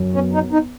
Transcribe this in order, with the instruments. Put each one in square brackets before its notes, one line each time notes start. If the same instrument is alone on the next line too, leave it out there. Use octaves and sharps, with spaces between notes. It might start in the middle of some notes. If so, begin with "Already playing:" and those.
Already playing: [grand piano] F#2
[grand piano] B3 [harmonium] C#4
[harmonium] D#4
[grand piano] B3
[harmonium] D#4